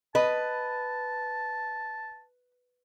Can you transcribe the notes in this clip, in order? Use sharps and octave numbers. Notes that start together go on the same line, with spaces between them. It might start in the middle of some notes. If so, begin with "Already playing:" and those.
B4 D#5 A5